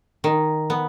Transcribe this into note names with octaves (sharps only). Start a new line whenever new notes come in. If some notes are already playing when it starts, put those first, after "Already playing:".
D#3
B3